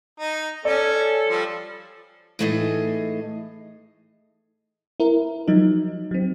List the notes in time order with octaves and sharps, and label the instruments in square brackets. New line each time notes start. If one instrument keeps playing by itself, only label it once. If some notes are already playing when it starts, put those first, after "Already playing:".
[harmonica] D#4
[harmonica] C#4 [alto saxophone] A4 [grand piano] D5
[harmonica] F3 G3
[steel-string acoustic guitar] A2 E3 A3 D#4 G#4 D#5
[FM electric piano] E4 A#4
F3 F#3 D#4
F#3 C4